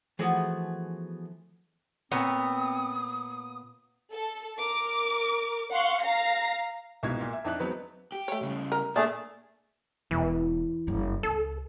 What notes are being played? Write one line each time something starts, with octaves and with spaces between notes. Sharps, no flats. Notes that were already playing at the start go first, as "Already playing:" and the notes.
E3 F3 A3 B3 F#4 G#4
A#2 B3 C4 C#5 D#6
A4
A#4 D6
F5 F#5 C6 C#6
F5 A#5 A#6 C7
C2 G#2 B2 F4 G#6
A#2
E5
F2 D4 D#4 E5 F#6
F#3 G#3 B3 C4 D#4 B4
G4
A3 C#5
C#3 G3
A#4
A#2 A3 D4 G#4 D5 A5
E1 E3
F#1 G2
C#2 A4